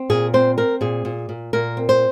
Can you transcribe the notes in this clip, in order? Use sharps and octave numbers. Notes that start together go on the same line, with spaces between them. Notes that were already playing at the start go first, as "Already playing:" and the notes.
Already playing: C4
A#2 G#4
C4 C5
C4 A#4
A#2 G#4
A#2
A#2
A#2 A#4
C4
C5